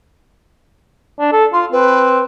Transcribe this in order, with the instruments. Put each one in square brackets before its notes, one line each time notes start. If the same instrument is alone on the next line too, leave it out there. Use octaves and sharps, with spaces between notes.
[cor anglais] D4
A4
[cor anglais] F4 [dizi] C6
[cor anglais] C4 [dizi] B4